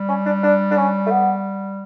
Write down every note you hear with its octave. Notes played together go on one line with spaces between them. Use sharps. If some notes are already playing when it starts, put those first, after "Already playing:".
Already playing: G3
C#4
D4
D4
D4
C#4
A3
B3